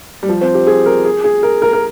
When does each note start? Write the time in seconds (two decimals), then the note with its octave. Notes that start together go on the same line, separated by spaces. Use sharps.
0.23 G3
0.29 F3
0.41 C4
0.54 G4
0.67 G#4
0.86 A#4
1.05 G#4
1.24 G#4
1.43 A#4
1.62 A#4
1.73 A#4